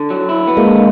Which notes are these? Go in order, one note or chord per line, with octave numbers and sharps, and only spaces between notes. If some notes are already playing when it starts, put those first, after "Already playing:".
Already playing: D3
F#3
E4
B3
G#3 A#3
D3